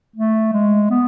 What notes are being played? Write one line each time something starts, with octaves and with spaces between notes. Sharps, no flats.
A3
G#3
B3